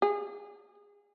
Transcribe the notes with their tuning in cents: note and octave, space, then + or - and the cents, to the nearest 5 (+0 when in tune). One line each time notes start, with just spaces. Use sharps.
G#4 -25